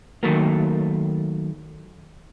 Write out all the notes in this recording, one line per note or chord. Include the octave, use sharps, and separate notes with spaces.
D#3 F#3 A3 A#3